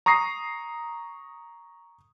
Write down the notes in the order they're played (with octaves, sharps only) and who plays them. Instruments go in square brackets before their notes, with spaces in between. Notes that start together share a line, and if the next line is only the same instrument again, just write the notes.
[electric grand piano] A#5 C#6 D#6 A#6 C7